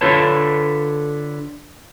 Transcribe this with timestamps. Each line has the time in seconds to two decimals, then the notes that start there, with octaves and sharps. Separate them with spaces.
0.01 D3 F4 A4 B4 C#5 A5